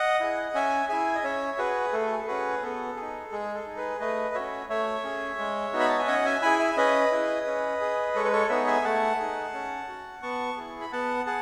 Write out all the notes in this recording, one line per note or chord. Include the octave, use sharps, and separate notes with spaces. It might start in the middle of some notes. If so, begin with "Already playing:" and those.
Already playing: D#5 F#5
E4 G#4
C#4 E5 G#5
E4 G#4 E5 G#5
D#5
C#4 C#5 E5
F#4 G#4 B4
A3 A4
G#4
A4
C#4 F#4 G#4 B4
B3 A4
G#4
D#4
G#3 G#4
A4
D#4 G#4
G#4 B4
A3 B4 D#5
C#4 F#4 C#5 E5
A3 C#5 E5
C#4 G#4
G#3
B3 D#4 F#4
B5
A5
G#5
C#4 D#5 F#5
E5 G#5
E4 G#4 G#5 B5
E5 G#5
C#4 B4 D#5
E4 G#4
C#4
G#4
G#3 A4 C#5
B4
A4 C#5
B3 D#4 G#4 C#5 E5
E5 G#5
A3 F#5 A5
D#4 G#4
C#4
F#4
B3 A5 C#6
E4 G#4
B5
B3 F#5 A5
G#4 F#5 A5